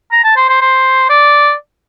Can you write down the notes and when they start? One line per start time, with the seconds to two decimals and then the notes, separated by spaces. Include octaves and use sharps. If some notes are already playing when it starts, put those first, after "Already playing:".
0.12 A#5
0.24 A5
0.36 C5
0.49 C5
0.61 C5
1.09 D5